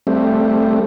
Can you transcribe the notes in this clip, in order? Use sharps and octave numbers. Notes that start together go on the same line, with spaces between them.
G3 A3 C4